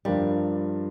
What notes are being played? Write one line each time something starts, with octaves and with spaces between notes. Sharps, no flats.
G2 F3 G3 D4 F4 A#4